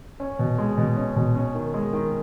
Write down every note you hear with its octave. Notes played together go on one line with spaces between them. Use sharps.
C#4
B2
G#3
B2
C#4
B2
C#4
D#3
G#3
D#3